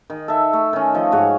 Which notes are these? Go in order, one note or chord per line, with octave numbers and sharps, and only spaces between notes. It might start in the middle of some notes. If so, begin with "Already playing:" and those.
D#3
A4 E5
A3
D#3 C#4
F3 A4 D#5
G#2 F#4 C#5